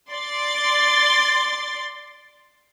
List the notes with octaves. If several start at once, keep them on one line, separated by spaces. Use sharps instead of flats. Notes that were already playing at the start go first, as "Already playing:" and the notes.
D5 C6 A6